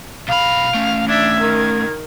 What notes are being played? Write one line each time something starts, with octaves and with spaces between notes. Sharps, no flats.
B1 F5 B5
A3 C#4
D4 E5 G#6
D#3